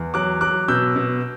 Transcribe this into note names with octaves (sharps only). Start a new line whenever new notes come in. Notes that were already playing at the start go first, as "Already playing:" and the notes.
Already playing: E2
F#3 D6 F#6
F#3 D6 F#6
B2 E6 G6
B2